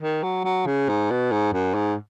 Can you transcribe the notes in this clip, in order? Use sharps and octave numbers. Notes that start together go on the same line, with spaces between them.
D#3
F#3
F#3
C#3
G#2
B2
G#2
F#2
G#2